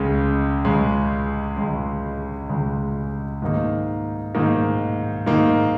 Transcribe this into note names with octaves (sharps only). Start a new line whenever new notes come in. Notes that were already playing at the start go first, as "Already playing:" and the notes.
Already playing: C#2 C#3 G#3
C#2 C#3 G#3
C#2 C#3 G#3
C#2 C#3 G#3
G#2 D#3 A#3 D#4
G#2 D#3 A#3 D#4
G#2 D#3 A#3 D#4